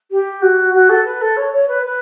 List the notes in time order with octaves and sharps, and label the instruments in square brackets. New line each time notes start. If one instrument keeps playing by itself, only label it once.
[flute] G4
F#4
F#4
A4
B4
A4
C#5
C#5
B4
B4